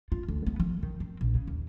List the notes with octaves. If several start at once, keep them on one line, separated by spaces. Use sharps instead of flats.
F4
D2
B3
F3
D#3
C4
A#1
C#3
D#2